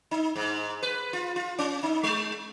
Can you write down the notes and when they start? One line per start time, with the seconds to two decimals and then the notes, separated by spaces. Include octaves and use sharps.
0.11 D#4
0.36 G#2
0.83 B4
1.13 F4
1.36 F4
1.58 C#4
1.83 D#4
2.03 G#3